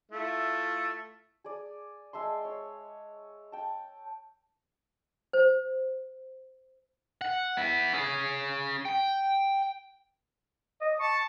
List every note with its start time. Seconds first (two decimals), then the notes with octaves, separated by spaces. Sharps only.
0.12 A3 E4 F4
1.44 G#4 D5
2.13 G#3 E5 A5 C6
2.45 C#5
3.52 G5 A5
5.33 C5
7.21 F#5
7.57 B3 E4
7.93 C#4 G#4
8.85 G5
10.81 D#5
11.00 A5 C#6